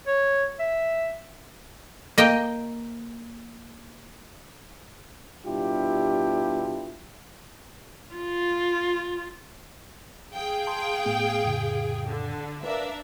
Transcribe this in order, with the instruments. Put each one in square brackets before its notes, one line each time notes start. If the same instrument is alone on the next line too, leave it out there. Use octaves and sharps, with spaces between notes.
[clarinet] C#5
E5
[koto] A#3 D#5 G5
[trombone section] B2 G3 D4 E4 F4 G4
[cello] F4
[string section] G#4 F5 G5
[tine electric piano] A5 C6
A2 A3 B3
F2 A2 C#3
[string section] D3
[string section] D4 A#4 E5 [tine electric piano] B4 F5